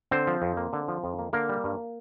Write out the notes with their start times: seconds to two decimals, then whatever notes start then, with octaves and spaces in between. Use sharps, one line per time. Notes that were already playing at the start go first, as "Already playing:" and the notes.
0.11 D3 C4 C5
0.27 F3
0.42 F2
0.57 A#3
0.73 D3
0.88 F3
1.04 F2
1.19 A#3
1.33 D3 A#3 A#4
1.49 G3
1.64 G2